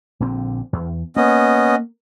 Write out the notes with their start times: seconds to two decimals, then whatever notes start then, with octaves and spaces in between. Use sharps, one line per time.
0.20 A#1 D3 C4
0.73 E2
1.16 A#3 B3 C#4 D#5